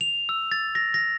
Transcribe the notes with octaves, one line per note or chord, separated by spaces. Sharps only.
F7
E6
A6
A#6
A#6